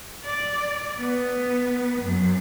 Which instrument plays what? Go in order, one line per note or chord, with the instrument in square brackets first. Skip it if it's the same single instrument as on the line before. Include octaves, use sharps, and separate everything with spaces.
[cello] D5
B3
F#2